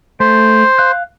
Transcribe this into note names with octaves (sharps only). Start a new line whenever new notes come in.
A3 C5
F5 F#6